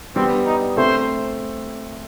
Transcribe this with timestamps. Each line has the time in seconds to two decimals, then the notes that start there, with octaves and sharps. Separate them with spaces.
0.16 G3 B3 C4
0.46 D#4
0.77 A3 C4 C5